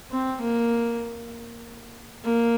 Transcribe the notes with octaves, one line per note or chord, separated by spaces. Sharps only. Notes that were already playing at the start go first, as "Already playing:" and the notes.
C4
A#3
A#3